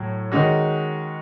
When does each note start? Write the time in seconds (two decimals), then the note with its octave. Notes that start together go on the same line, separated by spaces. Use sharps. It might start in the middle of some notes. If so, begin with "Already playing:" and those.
Already playing: A2 F#3
0.32 D#3 G#3 C#4 F#4